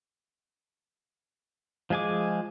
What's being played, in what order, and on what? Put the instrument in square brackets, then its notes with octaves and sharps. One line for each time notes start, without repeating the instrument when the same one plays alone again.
[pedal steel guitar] F3 G#3 G#4 G#5 D6